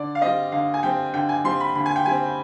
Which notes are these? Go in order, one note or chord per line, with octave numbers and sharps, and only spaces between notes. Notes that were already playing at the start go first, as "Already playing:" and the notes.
Already playing: D3 D5
F5
G3 C4 D#5
D3 F5
G#5
G3 C4 G5
D3 G5
G#5
G3 C4 C6
B5
D3 B5
G#5
G5
G3 C4 G#5